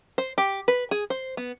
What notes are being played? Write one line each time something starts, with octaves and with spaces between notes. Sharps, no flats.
C5
G4
B4
G#4
C5
B3